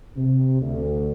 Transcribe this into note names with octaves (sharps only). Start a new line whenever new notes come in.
C3
D2